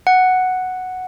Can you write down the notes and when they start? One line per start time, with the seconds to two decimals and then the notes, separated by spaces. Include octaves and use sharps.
0.07 F#5